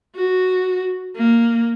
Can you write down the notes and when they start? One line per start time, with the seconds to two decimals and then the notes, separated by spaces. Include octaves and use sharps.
0.16 F#4
1.17 A#3